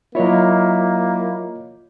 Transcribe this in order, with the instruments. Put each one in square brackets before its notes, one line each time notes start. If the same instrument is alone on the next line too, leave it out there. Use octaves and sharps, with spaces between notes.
[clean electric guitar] F#3 E4 [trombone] A#3 [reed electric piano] F4 C#5 D#5